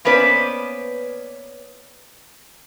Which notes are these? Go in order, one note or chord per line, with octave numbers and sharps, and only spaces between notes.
A#3 B3 C#4 B4 C5 D5